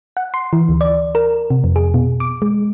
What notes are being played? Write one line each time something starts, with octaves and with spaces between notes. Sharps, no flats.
F#5
C6
E3
D2
D5
A#4
C3
F2
G#4
B2
D6
G#3